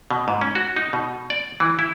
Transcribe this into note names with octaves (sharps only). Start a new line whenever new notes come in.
B2
G#2
C#4
F#4
D#4
B2
D5
E3
E4